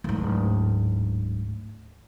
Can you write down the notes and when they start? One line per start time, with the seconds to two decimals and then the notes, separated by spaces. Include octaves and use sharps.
0.04 D1 G#2